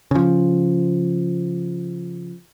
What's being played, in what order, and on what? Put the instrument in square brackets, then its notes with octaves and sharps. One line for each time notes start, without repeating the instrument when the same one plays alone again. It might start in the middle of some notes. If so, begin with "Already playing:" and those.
[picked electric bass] C#3 F3